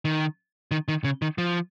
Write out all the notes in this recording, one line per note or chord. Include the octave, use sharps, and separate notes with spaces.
D#3
D#3
D#3
C#3
D#3
F3